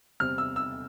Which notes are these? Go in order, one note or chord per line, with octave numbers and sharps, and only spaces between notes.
E2 C3 G3 C4 F6
E6
E6